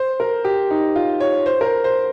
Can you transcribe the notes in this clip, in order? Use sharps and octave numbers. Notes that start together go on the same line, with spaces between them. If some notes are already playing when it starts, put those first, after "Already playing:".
Already playing: C5
A#4
G4
D#4
F4
C#5
C5
A#4
C5
C5